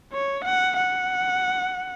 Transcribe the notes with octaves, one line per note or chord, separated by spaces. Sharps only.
C#5
F#5
F#5